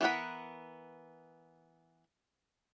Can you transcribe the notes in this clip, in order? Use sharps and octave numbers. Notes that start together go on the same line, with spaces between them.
E3 B3 A#4 F#5 B5